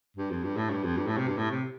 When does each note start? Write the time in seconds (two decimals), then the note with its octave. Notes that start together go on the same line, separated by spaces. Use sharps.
0.17 G2
0.30 F2
0.44 G2
0.57 A2
0.70 G2
0.84 F2
0.97 G2
1.07 A2
1.17 C3
1.27 G2
1.37 A2
1.51 C3